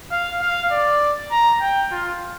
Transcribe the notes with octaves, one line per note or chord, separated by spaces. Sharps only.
F5
F5
D5
A#5
G5
F4